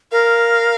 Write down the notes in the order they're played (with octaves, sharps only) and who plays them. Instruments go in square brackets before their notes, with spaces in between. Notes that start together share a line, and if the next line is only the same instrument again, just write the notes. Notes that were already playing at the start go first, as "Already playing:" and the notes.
[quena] A#4 [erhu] F5